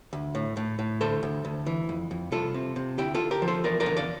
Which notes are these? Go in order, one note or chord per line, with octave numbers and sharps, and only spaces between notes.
D2
A2
A2
A2
D2 A4 C5
D2
D2
E3
F2
F2
C2 F4 A4
C3
C3
D2 E4 G4
F4 A4
D2
G4 A#4
F3
A4 C5
E2 A#4 D5
A#4 D5
D3
D5 F5